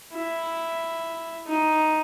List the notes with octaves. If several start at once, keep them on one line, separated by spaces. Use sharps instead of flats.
E4
D#4